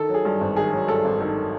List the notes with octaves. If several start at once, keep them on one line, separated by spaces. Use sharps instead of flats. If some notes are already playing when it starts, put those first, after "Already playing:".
Already playing: D#3 A4
F#3
G#4
G2
G#1
D#3 G#4
F#3
G2 A4
G#1
D#3 A4
F#3